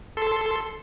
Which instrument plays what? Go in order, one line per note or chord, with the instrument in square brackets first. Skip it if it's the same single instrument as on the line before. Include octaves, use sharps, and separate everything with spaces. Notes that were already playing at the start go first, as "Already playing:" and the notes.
[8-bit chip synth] A4 C6